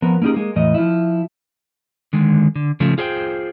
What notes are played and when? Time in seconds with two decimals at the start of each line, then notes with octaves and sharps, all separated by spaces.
0.02 F3 B3 A#4 B4
0.22 A#3 C#4 D#4 G4 G#4
0.34 G#3 A#3
0.56 E2 A2 E3 D#5
0.74 F3 E4
2.13 D3 D#3 G#3
2.55 D3
2.80 C#3 F3 A3
2.98 F4 G#4 C5 E5 G5